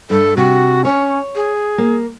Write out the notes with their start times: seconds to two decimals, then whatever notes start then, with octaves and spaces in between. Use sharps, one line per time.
0.10 G2 A4
0.37 C3 F#4
0.85 C#4 C#5
1.35 G#4
1.78 A#3